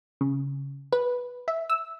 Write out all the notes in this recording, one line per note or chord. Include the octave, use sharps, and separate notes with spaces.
C#3
B4
E5
E6